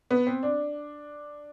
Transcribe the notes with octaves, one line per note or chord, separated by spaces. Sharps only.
B3
C4
D4